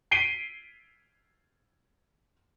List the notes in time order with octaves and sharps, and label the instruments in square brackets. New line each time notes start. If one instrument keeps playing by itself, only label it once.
[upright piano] B6 C7 D7 D#7 G7